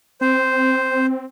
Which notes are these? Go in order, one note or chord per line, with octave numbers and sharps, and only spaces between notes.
C4 C5